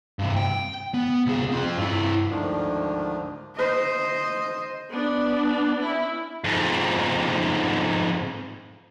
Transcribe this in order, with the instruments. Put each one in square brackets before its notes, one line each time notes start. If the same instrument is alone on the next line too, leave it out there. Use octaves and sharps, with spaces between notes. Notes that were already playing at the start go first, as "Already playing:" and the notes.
[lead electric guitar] G2 C3
G5
B3
C2 G#4
C4 F4
G2 E4
[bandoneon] D2 G#2 D3 D#3 F3 D4
[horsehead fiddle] C5 D#5
[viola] B3 D4
C#4 E4
[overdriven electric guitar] F2 G#2